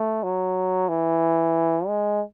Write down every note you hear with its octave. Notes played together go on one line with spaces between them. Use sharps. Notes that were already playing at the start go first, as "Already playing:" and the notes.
Already playing: A3
F#3
E3
G#3